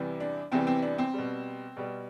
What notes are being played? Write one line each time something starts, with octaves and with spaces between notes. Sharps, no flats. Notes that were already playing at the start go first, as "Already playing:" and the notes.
Already playing: E2 C3 E3 G3
D4
E2 C3 E3 G3 C4
C4
D4
C4
B2 G3
B2 G3